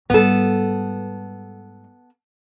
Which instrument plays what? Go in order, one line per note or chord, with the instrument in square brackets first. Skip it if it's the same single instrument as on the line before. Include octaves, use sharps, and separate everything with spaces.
[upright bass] G#2 G3 [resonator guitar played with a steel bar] B3 A4